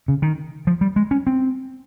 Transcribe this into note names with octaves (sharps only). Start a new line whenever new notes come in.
C#3
D#3
F3
G3
G#3
C#4
C4